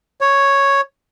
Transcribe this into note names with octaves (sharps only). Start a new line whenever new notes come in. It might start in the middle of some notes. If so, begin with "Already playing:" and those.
C#5